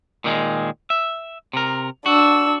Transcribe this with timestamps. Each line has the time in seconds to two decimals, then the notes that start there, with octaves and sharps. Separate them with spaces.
0.24 A#2 D#3 G#3
0.90 E5
1.53 C3 A#4
2.06 D4 F#4 E6